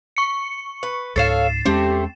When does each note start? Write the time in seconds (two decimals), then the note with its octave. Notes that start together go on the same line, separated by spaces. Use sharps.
0.17 C#6 C#7
0.83 B4
1.16 C#2 G#2 A4 C#5 F5 A6 C7 E7
1.65 E2 G#3 A3 C4 C#4 G4